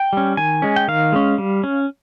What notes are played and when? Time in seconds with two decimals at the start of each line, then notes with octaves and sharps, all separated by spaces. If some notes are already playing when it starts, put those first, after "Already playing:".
Already playing: G5
0.13 G3 C#4
0.37 D#3 G#5
0.62 G#3 C#4
0.76 G5
0.88 D#3 F5
1.12 G#3 C#4
1.38 G3
1.64 C#4